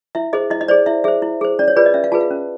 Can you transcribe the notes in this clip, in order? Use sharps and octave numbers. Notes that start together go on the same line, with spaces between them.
E4 E5
G#4 C5 D#5
E4 D#5
D#5
G#4 C5 D5
E4 E5
G#4 C5 E5
E4
G#4 C5
C#4 D5
C#5
F4 G#4 B4 D5
D#5
C#4 E5
F5
F4 G#4 B4 A5
F5
C#4